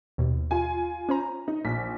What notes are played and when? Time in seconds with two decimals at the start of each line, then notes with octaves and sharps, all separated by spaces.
0.18 D#2 B2
0.51 F4 G#5
1.09 C#4 C5 A#5
1.48 D#4
1.65 A#1 B6